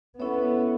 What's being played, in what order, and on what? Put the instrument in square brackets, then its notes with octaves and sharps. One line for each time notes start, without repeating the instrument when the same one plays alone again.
[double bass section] B3 [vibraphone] C#4 E4 A4 C#5 E5